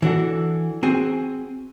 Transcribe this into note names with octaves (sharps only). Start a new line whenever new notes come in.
E3 D4 F#4 A4
C4 F#4 G#4 G#5